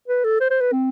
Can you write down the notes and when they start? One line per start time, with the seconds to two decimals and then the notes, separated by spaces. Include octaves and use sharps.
0.08 B4
0.24 A4
0.40 C5
0.50 C5
0.61 B4
0.72 C4